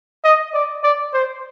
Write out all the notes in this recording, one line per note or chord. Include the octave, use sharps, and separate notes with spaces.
D#5
D5
D5
C5